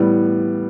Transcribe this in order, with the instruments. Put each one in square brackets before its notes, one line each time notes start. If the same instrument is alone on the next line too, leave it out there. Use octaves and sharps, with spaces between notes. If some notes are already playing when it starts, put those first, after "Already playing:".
Already playing: [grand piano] A2 E3 G3 B3